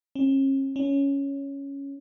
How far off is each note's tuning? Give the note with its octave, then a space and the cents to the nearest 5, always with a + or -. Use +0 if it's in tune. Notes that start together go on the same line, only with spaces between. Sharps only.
C#4 -40
C#4 +5